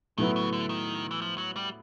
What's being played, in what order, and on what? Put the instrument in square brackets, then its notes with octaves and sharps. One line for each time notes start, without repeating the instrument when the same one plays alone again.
[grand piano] A2 F#3 B3 E4 [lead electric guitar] D#3
[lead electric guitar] C#3
D3
D#3
E3
F3
F#3
G3